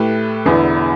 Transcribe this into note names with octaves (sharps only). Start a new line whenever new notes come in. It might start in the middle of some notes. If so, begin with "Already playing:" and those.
Already playing: A2 A3 G4 B4
E1 E2 D3 B3 E4